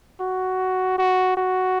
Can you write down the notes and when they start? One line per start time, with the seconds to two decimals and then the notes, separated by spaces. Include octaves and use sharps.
0.20 F#4
0.98 F#4
1.37 F#4